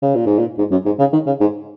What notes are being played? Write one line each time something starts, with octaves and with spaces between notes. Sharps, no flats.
C#3
A#2
G#2
A#2
G#2
F#2
G#2
C#3
D#3
C#3
G#2